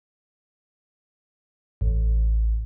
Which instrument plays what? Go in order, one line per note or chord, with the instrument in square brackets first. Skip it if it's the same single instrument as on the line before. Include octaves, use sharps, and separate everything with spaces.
[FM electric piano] A1